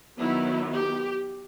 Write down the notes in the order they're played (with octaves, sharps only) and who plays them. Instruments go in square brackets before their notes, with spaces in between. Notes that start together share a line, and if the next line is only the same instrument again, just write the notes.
[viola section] D#3 F#3 B3 E4
G4